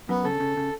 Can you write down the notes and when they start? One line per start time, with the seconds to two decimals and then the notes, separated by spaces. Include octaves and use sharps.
0.09 F#2 B3
0.24 C#3 A4
0.40 C#3
0.57 C#3